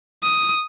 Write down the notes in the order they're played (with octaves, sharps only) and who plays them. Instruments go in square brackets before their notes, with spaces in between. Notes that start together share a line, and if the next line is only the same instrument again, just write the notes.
[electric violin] D#6